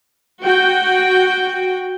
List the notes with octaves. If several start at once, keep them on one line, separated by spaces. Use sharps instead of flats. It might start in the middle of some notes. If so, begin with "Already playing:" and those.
F#4 G5